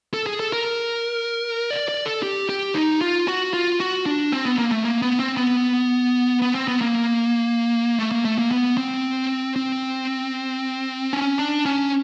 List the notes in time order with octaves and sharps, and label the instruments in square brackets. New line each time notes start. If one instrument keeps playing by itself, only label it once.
[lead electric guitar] A4
G#4
A4
A#4
D5
D5
A4
G4
G4
D#4
F4
F#4
F4
F#4
D4
C4
B3
A#3
A3
A#3
B3
C4
B3
B3
C4
B3
A#3
A3
A#3
A3
A#3
B3
C4
C4
C#4
D4
C#4